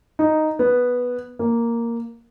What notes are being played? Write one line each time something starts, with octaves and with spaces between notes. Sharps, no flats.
D#4
B3
A#3